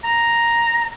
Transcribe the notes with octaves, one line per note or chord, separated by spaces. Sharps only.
A#5